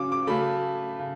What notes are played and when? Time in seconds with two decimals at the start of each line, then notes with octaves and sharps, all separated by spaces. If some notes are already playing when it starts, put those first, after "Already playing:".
Already playing: C#3 F#3 C#4 D6
0.12 D6
0.27 C#3 F#3 A3 B5
0.99 C#3